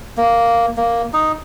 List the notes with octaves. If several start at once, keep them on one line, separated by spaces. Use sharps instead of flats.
A#3
A#3
D#4